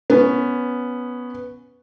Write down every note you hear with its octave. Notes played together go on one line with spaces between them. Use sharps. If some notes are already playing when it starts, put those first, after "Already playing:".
B3 C#4